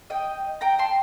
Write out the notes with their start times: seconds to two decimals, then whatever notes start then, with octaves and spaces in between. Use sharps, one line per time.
0.10 D#5 G5
0.61 G5 A#5
0.79 A5 C6